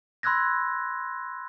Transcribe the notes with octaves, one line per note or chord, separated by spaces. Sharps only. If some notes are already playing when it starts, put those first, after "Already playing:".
B5 C6 E6 F#6 G#6 A#6